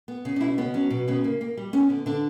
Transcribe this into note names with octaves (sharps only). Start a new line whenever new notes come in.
B3
C#3
D4
B2 E4
B3 C#4
F#3 C#4
B2
C#3 B3
A#3
A#3
G3
B3 C#4
D3
D3 D4